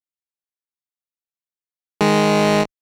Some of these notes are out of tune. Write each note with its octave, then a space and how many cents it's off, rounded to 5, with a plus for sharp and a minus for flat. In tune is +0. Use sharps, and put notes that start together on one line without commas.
D#3 +0 G#3 +0